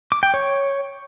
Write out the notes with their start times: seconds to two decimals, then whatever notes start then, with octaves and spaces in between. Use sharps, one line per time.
0.12 D6
0.23 G5
0.34 C#5